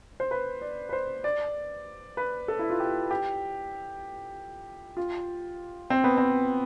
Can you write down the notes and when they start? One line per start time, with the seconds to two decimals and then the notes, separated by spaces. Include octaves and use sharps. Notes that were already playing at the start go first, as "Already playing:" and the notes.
0.20 C5
0.31 B4
0.62 D5
0.89 B4
0.93 C5
1.24 D5
2.17 B4
2.48 A4
2.59 E4
2.70 F4
2.80 G4
3.11 G4
4.97 F4
5.90 C4
6.04 B3
6.18 C4